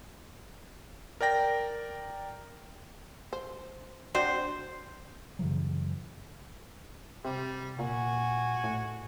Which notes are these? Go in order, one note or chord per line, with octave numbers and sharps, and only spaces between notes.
A#4 D5 G5 A#6
C5
C4 D4 F#4 C5
F#2 C#3 E3 F#3
C3 G3
A#2 F#4 F#5 G#5
A2